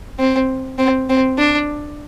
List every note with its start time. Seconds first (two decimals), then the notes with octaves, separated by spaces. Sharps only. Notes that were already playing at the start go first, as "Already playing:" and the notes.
0.19 C4
0.79 C4
1.10 C4
1.38 D4